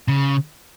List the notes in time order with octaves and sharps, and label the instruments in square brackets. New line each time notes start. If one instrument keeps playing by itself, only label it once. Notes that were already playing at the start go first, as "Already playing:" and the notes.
[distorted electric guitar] C#3